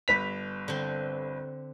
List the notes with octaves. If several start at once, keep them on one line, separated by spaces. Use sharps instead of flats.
G1 B4 B6 F7
D3 C4